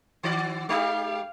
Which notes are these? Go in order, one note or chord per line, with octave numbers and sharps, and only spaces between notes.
D#3 F#4 D5
G#3 D#4 G4 F5